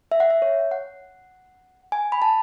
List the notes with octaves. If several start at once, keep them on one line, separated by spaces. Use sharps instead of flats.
E5
F#5
E5
C#5
F#5
G#5
B5
A5